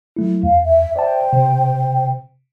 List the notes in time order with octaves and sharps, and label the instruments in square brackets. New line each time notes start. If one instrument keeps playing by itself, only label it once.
[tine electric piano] F#3 A3 E4
[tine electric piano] E2 [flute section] F5
[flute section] E5
[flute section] C5 G5 [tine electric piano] D5 E5 A5
[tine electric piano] C3